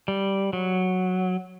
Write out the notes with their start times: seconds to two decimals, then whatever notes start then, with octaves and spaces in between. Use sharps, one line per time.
0.08 G3
0.53 F#3